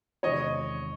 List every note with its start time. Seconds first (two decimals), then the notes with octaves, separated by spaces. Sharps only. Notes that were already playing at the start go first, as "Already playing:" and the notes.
0.23 E2 C3 D#3 G#3 C4 C#5 D#5